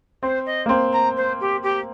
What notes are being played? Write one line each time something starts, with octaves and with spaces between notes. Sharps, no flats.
C4 C5
D#5
A#3
C4
A#5
C5
G4
G4